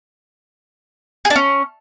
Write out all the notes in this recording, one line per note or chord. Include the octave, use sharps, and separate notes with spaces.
G#4
D4
C#4